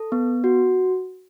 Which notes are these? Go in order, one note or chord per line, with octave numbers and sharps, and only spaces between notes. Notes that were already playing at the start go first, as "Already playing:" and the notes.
Already playing: A4
B3
F#4